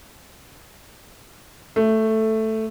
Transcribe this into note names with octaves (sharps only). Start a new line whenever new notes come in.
A3